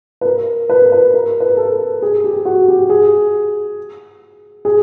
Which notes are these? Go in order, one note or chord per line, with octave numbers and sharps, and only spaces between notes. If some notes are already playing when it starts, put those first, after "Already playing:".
B4
A#4
B4
A#4
B4
A#4
B4
A#4
A4
G#4
G4
F#4
G4
G#4
G#4